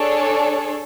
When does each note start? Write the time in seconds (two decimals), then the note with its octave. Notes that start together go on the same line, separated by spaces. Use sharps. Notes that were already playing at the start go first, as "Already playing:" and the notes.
Already playing: D4 G#4 A4 C#5